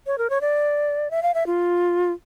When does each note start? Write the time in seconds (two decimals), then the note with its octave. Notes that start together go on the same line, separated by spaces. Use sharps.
0.07 C#5
0.18 A#4
0.30 C#5
0.41 D5
1.11 E5
1.23 F5
1.34 E5
1.47 F4